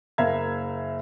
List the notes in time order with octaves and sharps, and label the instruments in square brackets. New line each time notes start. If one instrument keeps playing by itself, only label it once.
[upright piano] F#1 A#3 E5 F5 A#5 G#6